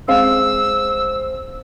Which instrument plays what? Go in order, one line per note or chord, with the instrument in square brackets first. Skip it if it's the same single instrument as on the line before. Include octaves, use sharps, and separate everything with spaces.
[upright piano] G#3 C4 F5 [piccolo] E6